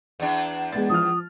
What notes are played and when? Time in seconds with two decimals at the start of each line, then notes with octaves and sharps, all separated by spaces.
0.20 E2 D4
0.73 G#3 B3 A6
0.90 F3 D#6 F6